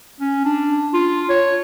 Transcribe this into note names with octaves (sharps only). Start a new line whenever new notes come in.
C#4
D4
F4
C#5